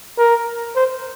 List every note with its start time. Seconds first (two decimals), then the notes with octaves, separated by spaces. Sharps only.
0.18 A#4
0.76 C5